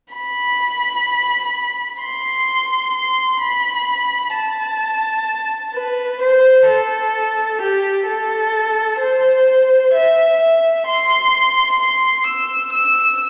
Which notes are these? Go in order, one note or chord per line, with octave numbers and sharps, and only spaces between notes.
B5
C6
C6
B5
A5
B4
C5
A4
G4
A4
C5
E5
E5
C6
C6
E6
E6